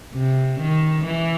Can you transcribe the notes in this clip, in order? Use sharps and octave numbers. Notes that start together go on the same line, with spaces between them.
C3
D#3
E3